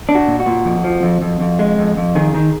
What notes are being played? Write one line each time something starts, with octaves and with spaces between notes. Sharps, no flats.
D4
F#4
A#2
F#4
A#2
F2
F3
F2
F2
F2
G#3
F2
F2
D#3 G#4
D#3